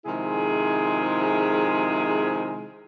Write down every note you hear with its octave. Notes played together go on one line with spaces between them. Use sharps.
C3 D#3 F3 G#3 E4 G#4